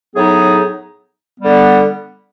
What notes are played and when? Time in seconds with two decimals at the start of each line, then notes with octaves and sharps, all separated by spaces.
0.16 A2 F#3 B3 D#4 G#4
1.40 D3 G3 B3